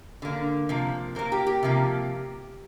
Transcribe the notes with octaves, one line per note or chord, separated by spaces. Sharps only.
D3 A#3
C3 F3 A#3
A#2 A#3 A#4
G4
G4
C3 F3 A#3